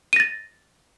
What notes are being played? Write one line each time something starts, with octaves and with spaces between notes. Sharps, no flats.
A6 A#6 D#7